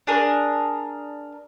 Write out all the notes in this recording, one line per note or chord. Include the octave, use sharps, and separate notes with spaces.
D4 G#4 A#4